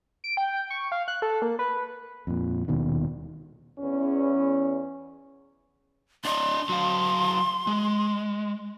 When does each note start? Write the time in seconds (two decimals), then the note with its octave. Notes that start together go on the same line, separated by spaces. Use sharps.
0.24 D7
0.37 G5
0.70 C#6
0.92 F5
1.08 F#6
1.22 A4
1.42 A#3
1.59 B4
2.27 F2 A#2
2.68 D#1 D#2 B2 D#3
3.78 E2 C#4
6.25 D4 D5 D#5 C6
6.69 F#3 F5
7.67 G#3